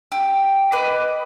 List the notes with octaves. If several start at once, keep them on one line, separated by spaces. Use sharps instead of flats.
G4
B4 D#5 B5 D6